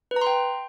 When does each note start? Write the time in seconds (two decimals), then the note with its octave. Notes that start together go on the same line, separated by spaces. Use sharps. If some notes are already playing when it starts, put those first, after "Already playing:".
0.11 B4
0.16 A#5
0.21 C6
0.27 G5